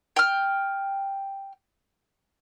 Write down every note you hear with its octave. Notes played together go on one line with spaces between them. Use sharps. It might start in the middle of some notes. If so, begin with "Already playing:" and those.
G5 F6